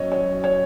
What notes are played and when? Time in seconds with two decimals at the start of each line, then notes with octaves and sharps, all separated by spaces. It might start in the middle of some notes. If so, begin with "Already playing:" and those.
Already playing: F#2 C#5 D#5
0.12 C#5
0.44 C#5